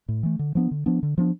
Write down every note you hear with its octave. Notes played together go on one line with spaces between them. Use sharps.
A2
E3 A3
D3
F3 B3 D4
D3
F3 B3 D4
D3
F3 B3 D4